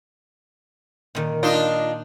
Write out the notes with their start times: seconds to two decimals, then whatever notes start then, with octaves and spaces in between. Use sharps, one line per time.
1.15 A#2 D#3
1.43 D4 D#4 F4